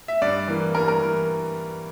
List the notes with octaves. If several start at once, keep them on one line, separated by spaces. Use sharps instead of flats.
E5
G2 D5
E3 A#3
G2 A#4
A#4
E3